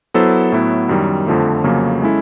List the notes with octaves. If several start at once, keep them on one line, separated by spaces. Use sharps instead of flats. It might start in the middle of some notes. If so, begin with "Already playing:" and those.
F#3 B3 E4 A4 C5
A2 F#3 B3 E4
F#2 D#3 G3
F2 D3 F3 A3
F2 C#3 F#3 A#3 C#4
G#3 C#4 E4 A4